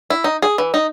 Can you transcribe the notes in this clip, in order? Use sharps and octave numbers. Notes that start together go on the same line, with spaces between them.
E4
D#4
G#4
E3
D#4